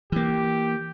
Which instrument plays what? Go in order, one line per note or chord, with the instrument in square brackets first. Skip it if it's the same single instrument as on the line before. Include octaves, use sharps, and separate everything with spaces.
[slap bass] E3 A#3 [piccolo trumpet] G4